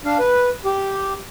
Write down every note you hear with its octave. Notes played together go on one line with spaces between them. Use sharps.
D4 F5
B4
G4